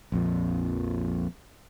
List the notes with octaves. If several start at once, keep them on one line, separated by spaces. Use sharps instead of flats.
A#1 F2 A#2